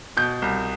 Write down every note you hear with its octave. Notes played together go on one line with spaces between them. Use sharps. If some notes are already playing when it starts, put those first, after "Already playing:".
B2 G6
C2